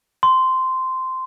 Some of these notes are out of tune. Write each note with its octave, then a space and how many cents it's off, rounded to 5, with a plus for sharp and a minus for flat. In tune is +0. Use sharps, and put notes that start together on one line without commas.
C6 -10